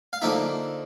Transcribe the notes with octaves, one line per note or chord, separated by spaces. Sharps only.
F5
D3 F3 A#3 D#4 E5